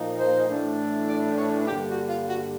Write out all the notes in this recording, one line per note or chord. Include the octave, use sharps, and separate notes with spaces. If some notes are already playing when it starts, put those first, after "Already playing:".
Already playing: A#2 F3 A#3 D#4
C5
A2 E3 A3 D4
D5
C#5
G2 D3 G3 A#3 G4
F#4
F4
F#4